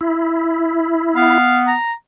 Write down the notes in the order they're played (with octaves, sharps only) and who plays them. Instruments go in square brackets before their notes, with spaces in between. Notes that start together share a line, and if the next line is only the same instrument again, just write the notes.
[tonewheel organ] E4
[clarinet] B3 [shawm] F5
[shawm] A#5